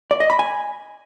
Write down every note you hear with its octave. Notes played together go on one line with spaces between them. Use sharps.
D5
D#5
B5
G#5